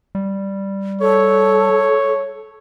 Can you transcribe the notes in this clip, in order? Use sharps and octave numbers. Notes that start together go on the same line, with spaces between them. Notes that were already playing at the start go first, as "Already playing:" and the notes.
G3
A4 C#5